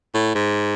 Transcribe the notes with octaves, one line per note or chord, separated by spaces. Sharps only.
A2
G#2